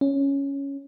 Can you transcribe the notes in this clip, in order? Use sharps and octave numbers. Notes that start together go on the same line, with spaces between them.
C#4